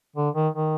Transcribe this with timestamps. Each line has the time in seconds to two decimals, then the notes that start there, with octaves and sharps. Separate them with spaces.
0.16 D3
0.35 D#3
0.55 D#3